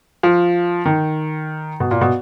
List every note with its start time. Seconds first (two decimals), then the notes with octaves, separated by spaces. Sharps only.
0.23 F3
0.85 D#3
1.80 B2
1.91 A#2
2.01 B2